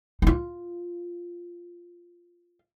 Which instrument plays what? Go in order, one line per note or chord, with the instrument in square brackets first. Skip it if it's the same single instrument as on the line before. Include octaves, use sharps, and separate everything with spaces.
[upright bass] D#4 F4